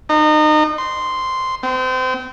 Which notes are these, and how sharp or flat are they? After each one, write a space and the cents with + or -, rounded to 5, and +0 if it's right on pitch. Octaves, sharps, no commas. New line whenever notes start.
D#4 -30
C6 -5
C4 -30